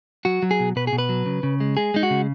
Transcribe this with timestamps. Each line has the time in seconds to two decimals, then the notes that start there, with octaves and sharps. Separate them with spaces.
0.25 F#3 F#4
0.43 F#3
0.51 G#4
0.60 B2
0.76 B2 B4
0.87 G#4
0.92 B2
0.98 B4
1.09 F#3
1.26 C#3
1.43 C#3
1.60 G#3
1.77 G#3 G#4
1.94 G#3 D#4
2.03 F#4
2.10 C#3